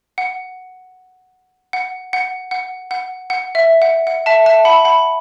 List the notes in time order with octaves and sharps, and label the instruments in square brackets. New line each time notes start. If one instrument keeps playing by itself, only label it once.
[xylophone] F#5
F#5
F#5
F#5
F#5
F#5
E5
F#5
F#5
E5 A5
E5 A5
F#5 B5
F#5 B5